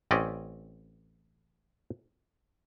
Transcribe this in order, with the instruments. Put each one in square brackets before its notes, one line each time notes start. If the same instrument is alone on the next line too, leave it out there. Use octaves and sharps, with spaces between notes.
[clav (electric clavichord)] A1 C4 C#4 D5 D#5